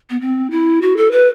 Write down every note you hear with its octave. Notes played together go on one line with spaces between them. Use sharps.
B3
C4
E4
F#4
A4
B4